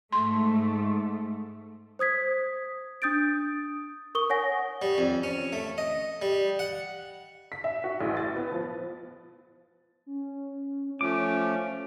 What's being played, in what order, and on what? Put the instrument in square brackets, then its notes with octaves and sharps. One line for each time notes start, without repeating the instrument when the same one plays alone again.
[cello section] G#2 A3 [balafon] C6
[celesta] C5 D#6 G#6 B6
D4 D#6 G6 A6 D7
A#4 C#6 D#6 G7
C#5 F#5 G#5 A#6
[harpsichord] G3
F2
C#4
A3
D#5
G3
F#5
[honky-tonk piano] B6
E5
F#4
A1
A6
B3
F3
[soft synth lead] C#4
[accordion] F3 A3 C#4 [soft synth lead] F4 [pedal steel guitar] D6